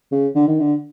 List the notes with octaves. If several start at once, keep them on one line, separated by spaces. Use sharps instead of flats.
C#3
D3
D#3
D3